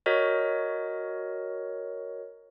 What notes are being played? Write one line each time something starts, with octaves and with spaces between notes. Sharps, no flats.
F#4 A#4 C#5 D#5